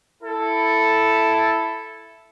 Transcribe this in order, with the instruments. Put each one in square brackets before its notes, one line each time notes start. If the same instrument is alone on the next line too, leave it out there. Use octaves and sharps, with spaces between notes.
[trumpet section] E4 A4